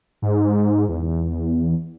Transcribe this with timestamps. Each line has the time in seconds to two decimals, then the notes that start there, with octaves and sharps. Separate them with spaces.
0.22 G#2
0.89 E2